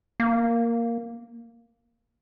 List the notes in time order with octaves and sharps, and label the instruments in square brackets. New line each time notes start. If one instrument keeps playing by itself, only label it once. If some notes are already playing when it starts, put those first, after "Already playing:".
[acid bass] A#3